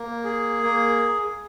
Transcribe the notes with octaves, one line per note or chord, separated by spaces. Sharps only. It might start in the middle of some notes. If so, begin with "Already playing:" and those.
Already playing: A#3
G#4
A#3